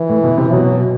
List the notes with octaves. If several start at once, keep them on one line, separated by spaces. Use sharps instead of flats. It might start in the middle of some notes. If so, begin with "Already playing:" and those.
Already playing: E3
A2
B2
C3
B2 F#3